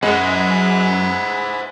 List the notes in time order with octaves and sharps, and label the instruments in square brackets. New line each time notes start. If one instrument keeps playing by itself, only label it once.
[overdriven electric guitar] F#2 [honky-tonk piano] G#3 [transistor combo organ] E4 G#4 B4 [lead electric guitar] C5 F#5